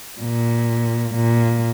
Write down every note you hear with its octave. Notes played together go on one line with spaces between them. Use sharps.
A#2
A#2